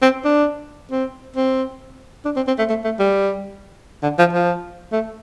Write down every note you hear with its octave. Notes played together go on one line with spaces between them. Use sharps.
C4
D4
C4
C4
D4
C4
C4
A3
A3
A3
G3
D3
F3
F3
A3